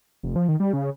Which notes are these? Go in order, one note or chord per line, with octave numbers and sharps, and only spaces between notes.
F1
F3
D#3
G3
C#3